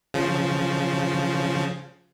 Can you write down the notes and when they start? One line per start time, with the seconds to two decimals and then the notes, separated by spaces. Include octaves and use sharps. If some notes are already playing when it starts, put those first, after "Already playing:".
0.14 C#3 F3